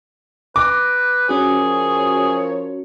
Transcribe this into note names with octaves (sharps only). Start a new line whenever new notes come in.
B4 D6 A#6
F3 C#4 F#4 G#4 A#4 C#5